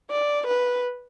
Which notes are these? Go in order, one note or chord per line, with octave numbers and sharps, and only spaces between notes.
D5
B4